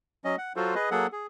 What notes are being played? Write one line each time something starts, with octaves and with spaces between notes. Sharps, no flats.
F#3 C#4 D#5
F#5
F#3 F4 F#4 A4 C5
G#4 B4 D#5
F#3 A#3 G#4 A4 F#5
G#4